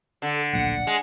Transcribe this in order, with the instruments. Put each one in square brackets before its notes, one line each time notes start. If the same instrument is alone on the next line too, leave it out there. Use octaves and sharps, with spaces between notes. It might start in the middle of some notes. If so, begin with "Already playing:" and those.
[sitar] D3 [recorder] A4
[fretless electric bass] D1 A#1 [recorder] F#5
[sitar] G#3